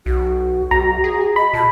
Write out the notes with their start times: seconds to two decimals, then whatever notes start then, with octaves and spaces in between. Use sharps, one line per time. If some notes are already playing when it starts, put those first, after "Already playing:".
0.06 B1 F#4
0.71 B1 A#5
1.04 G#4
1.36 D#5 B5
1.53 A#2 A5